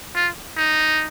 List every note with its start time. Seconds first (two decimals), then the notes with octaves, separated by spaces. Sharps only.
0.15 F4
0.57 D#4